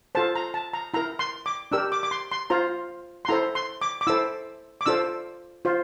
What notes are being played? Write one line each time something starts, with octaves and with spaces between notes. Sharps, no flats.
F4 A4 C5 A5
A#5
A5
A#5
E4 A#4 A#5
C6
D6
D4 G4 A#4 E6
D6
D6
C6
C6
F4 C5 A#5
C6
E4 A4 C5 A#5
C6
D6
D6
E4 A4 C5 E6
D6
D4 F4 A4 C5 E6
F4 C5